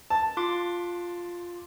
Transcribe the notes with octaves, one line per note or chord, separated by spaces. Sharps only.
A5
F4 C6 D6